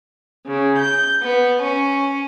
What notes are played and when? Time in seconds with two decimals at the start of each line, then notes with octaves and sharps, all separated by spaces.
0.46 C#3
0.78 G6
1.21 B3
1.61 C#4